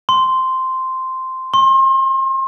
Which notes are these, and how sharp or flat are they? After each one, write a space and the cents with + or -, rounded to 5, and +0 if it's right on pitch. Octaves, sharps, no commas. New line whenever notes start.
C6 -5
C6 +35